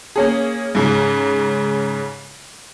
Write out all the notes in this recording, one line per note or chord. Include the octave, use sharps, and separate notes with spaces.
A#3 C#4 G#4
G#2 C#3